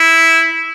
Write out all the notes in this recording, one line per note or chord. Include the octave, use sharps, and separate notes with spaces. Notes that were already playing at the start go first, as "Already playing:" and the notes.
Already playing: E4